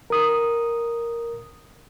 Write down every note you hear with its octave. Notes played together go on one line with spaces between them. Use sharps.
A#4 D#6